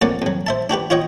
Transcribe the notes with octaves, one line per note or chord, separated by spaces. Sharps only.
F2 A#3 C#4 D5 F#5
F2 F#3
C5 E5 A5
D4 F#4 G4 B4
F4 F#4 C#5 D#5 G5